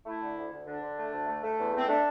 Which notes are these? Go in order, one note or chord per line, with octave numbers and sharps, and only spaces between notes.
A3 E4
D3
D2
D2
D3 D4
D3
A3
D2
A3
A3
E2
A3 C4
A3 D4